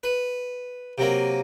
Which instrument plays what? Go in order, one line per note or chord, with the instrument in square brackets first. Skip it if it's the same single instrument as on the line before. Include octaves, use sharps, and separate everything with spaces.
[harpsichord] B4
C3 F#3 A#3